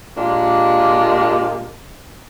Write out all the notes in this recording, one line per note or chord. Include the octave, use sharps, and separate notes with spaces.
A#2 G#3 D4 F4 G4